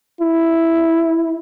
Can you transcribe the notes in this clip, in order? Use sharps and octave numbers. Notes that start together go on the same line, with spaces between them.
E4